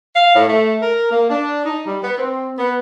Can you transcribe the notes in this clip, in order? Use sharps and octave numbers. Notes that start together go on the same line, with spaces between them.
F5
A2
A3
A#4
A#3
D4
D#4
G3
B3
C4
B3